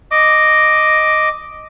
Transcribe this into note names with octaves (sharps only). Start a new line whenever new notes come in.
D#5 D6